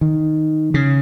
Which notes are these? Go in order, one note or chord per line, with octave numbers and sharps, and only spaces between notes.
D#3
C#3